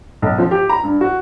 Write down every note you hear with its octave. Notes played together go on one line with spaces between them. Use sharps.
B1
F3
G4
A#5
G2
F#4